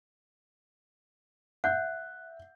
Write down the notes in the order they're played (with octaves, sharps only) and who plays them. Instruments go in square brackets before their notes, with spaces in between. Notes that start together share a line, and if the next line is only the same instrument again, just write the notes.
[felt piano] E5 G6 [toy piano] F#5 [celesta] F#6